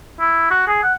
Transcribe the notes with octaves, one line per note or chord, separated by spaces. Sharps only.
E4
F#4
G#4
F#5